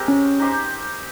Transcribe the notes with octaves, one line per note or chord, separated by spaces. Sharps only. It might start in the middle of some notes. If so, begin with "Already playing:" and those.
Already playing: G#3 C4 G4 A#4
C#4
D#4 G4 C5